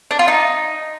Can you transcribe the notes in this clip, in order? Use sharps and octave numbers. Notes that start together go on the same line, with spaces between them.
D4
F4
D#4